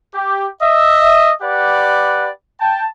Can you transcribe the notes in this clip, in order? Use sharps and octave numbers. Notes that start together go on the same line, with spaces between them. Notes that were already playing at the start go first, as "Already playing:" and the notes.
G4
D#5 E5
G4 B4 D5 F#5
G5 A5